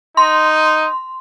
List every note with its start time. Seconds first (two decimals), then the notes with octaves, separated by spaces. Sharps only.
0.17 D#4 C6